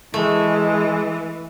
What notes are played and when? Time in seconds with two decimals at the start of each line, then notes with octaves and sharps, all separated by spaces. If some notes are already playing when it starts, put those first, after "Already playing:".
0.14 E3 G#3 A3